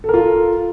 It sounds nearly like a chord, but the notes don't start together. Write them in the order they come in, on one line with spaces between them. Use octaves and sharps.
A4 A#4 F4